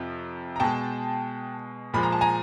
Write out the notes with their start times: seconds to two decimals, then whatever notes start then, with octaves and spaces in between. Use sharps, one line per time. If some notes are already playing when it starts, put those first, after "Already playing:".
Already playing: F2 C3 F3
0.56 A#5
0.60 B2 G#3 G5 A5
1.94 A#2 F3 G#3 B5
2.03 A#5
2.12 A5
2.21 G#5 A#5